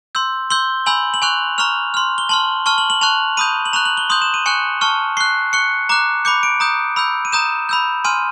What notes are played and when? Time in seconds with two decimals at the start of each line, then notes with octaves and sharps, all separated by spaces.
0.15 C6 E6 G6
0.50 C6 E6 G6 G7
0.86 G#5 B5 E6 G6 F#7
1.14 F#7
1.22 G#5 C#6 F#6 F7
1.58 A#5 C#6 F6 F7
1.94 C6 F6
2.18 G7
2.29 A5 C6 F6 F#7
2.66 A5 C#6 F6 G7
2.78 F#7
2.90 F#7
3.01 A5 C#6 F#6 F7
3.37 B5 D#6 G6 D#7
3.66 F#7
3.73 A#5 C#6 F#6 F7
3.85 F#7
3.97 G7
4.10 C6 D#6 G6 F#7
4.22 E7
4.34 D#7
4.46 G#5 C#6 F#6 C#7
4.81 A5 C#6 F6
5.17 C#6 F#6 C7
5.53 C#6 F#6 C#7
5.89 A#5 D6 F#6
6.25 B5 D6 G6 C#7
6.43 D7
6.60 A#5 D#6 G6
6.96 B5 E6 G6
7.25 D#7
7.32 A#5 D#6 G6 E7
7.69 B5 E6 G6
8.05 G#5 C6 F6 D#7